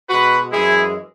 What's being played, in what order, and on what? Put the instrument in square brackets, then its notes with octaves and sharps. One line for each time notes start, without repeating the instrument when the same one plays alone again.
[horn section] B2 G#3 F#4 B4
F#2 E3 G#3 E4 G#4